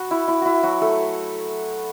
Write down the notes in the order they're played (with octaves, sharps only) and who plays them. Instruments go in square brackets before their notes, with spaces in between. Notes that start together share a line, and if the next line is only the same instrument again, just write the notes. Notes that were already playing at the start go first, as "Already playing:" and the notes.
Already playing: [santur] F#4 B4
E4
E4
E4 F#4
F#3 F#4
A3 A4